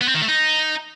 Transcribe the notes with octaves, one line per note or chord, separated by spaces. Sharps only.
B3
C4
D#3
A3
D#4